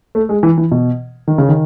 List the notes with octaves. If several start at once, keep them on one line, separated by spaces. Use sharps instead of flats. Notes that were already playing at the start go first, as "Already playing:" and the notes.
A3
G#3
E3
E3
B2
D#3
C#3
D#3